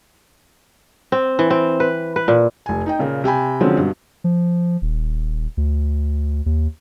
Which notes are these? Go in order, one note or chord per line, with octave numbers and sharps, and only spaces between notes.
C4
E3
C4
B4
B4
A#2
F1 G#5
D#4 D#5 G5
A#2 C#3 A#3
C3 G5 G#5 B5
D3 F3 F#3 G#3 C4 C#4
G2 B2
F3
D#1
D2
D#2